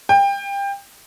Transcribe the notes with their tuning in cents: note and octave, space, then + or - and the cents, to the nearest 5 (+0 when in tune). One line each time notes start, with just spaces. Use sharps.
G5 +25